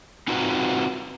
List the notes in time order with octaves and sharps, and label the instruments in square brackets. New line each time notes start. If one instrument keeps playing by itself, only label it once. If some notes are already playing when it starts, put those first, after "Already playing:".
[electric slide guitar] C4 D#4 F4 F#4 B4 A#5